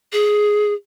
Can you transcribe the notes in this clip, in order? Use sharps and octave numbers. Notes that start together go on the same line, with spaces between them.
G#4